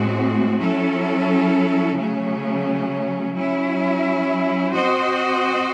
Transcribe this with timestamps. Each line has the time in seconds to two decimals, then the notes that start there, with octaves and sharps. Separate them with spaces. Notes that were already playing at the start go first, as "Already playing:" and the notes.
Already playing: A2 G#3 C4 F#4
0.58 F#3 C#4 E4 A4
1.96 C#3 F#3 A3 C#4
3.35 F#3 C#4 E4
4.73 C4 F#4 C5 D#5